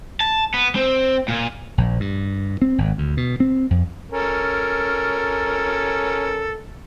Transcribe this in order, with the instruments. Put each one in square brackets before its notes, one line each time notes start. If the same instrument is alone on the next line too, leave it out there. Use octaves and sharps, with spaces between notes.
[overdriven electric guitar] A5
B3
C4
A#2
[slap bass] A#1
G2
C4
G#1
D2
B2
C4
F2
[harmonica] C#4 A4 A#4